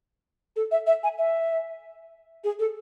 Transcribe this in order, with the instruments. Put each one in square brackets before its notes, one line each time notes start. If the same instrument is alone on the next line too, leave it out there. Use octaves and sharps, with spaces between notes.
[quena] A4
E5
E5
G#5
E5
G#4
A4